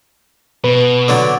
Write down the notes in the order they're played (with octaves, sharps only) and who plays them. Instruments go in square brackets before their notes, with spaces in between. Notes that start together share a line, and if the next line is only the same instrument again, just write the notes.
[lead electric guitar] B2 [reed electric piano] B4
[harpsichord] D3 F#3 D4